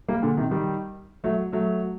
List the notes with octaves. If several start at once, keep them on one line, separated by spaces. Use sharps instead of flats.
G3 A#3
A#2 D3
C3 D#3
D#3 G3
F#3 A3
F#3 A3